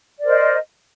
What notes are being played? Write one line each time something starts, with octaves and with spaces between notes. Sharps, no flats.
A#4 C5 D5 D#5